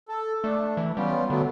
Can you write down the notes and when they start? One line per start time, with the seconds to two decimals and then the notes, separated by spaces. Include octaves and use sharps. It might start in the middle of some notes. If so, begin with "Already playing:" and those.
0.09 A4
0.44 A3 D4
0.77 E3
0.97 G3 B3 C#4 F4
1.30 D3 F#3 A3 B3